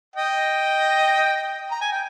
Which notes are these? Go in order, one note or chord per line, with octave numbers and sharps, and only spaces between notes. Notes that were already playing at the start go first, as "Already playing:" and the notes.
D#5 G5
A#5
G#5
G5